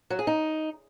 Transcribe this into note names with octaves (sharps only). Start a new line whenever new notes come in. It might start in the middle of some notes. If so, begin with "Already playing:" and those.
F#3
G#4
D#4